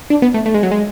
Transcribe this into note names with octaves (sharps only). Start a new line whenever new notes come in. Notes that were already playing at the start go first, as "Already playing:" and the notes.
D4
B3
A3
A3
G#3
F#3
G#3